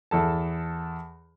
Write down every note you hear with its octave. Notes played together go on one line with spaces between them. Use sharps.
E2 A4 A5